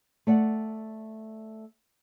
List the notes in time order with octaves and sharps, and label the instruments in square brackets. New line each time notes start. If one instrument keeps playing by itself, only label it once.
[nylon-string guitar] A3 D5 F#5